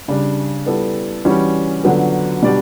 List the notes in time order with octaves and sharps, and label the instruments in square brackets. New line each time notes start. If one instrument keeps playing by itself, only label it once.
[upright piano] C#3 G3 D4
G3 B3 E4 A4
E3 G3 C#4 F#4
D3 F#3 B3
B2 G3 D4 G4 D5